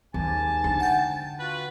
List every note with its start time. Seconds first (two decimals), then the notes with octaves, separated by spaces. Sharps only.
0.14 D#2 G#2 G#5 A5
0.64 D3
0.80 F#5 G5
1.39 F4 F#4 B4